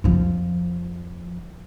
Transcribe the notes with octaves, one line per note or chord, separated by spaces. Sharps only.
F2 F3